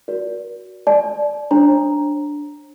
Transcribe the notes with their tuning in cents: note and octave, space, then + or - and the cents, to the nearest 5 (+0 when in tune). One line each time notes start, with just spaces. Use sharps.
F#4 +0 A#4 +40 D5 -25
D5 +5 A5 -40
D4 +0 C#5 -45 A#5 +0